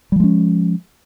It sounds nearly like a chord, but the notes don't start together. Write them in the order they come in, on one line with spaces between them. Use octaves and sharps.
G3 F3 G#3 C#4